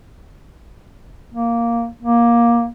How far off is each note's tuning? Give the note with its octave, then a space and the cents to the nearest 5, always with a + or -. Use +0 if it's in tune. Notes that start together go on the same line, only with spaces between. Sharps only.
A#3 +0
A#3 +15